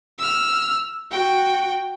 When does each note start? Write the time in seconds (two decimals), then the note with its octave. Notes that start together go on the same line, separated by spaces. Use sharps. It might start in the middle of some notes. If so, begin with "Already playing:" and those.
0.19 E6 F6
1.11 F#4 G5